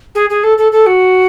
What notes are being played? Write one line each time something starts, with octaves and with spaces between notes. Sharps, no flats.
G#4
G#4
A4
A4
A4
F#4